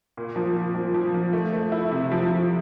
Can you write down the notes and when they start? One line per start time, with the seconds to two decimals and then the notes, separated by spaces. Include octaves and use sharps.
0.17 A#2
0.36 F3
0.56 A#2
0.75 F3
0.94 F3
1.14 F3
1.33 A3
1.53 A3
1.72 E4
1.92 C3
2.12 F3
2.30 F3